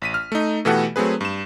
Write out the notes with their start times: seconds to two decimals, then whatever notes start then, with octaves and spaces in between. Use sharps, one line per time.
0.02 A1 B6 D#7
0.14 F6
0.32 A3 D#4
0.65 B2 E3 A3 G4 A4 F#5
0.96 F#3 A3 C4 G#4 B4
1.21 G2 E7